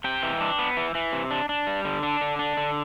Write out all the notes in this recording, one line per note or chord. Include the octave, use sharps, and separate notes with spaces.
C3 G5
E3
D4
B3
E3
E3
C3
D4
D4
G3
D3
D4
D3
D4
D3